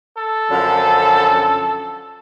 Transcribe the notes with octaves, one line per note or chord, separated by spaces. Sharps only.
A4
F#2 D3 F3